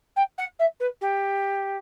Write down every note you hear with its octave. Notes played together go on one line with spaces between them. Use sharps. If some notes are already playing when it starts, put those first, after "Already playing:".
G5
F#5
E5
B4
G4